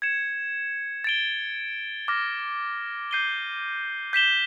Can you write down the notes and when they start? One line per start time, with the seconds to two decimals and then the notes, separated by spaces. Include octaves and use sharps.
0.02 G#6 C#7 E7
1.04 A6 D7 G7
2.08 D6 F6 A#6
3.11 G6 C7 D#7 G7
4.13 G6 B6 E7 G7